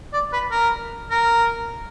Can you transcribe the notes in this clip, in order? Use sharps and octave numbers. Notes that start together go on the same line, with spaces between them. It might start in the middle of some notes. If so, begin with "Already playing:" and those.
D5
B4
A#4
A#4